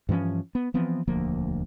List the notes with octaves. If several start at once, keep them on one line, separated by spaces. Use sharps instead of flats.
G2 E3 F3 C#4
B3
E3 F3 B3 C4
E1 D2 F3 A#3